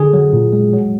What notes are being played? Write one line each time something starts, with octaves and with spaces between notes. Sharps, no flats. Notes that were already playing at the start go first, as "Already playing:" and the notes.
Already playing: D3 G#4
F#3
A#2
G#3
F#3